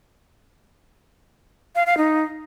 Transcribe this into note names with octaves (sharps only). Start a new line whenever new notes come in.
F5
F5
D#4